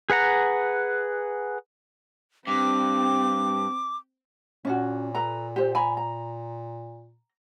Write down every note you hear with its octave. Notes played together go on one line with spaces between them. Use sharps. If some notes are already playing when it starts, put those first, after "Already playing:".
G#4 B4 F#5 A#5
G2 C4 D6
A#2 C#4 D4 F#4
A4 B4 A#5
G4 C5
G#5 A#5 B5
A#5